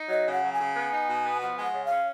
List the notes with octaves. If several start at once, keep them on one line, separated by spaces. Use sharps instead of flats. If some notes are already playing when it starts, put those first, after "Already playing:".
Already playing: D#4
F#3 D#5
C#3
F#5
F#3
G#5
C#3
B3
D#4
B2
B3
F3 F#5
G#3 G#5
F#5
C#3
C#4 F5